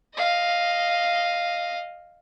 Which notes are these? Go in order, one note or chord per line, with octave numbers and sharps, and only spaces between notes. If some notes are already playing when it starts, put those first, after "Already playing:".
D#5 F5